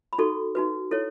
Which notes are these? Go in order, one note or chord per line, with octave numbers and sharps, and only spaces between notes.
B5
D#4 F#4 A4 C#6
D#4 F#4 B4
E4 A4 C#5